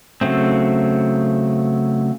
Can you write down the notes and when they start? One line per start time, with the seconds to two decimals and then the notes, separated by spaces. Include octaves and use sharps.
0.21 C#3 F#3 A3 C4